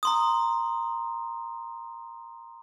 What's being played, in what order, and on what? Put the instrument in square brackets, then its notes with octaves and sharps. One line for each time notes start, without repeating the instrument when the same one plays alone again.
[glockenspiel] A#5 C6 D#6